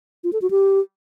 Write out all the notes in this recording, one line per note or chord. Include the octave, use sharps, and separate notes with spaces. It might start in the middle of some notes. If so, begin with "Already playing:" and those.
F4
A4
F#4
G4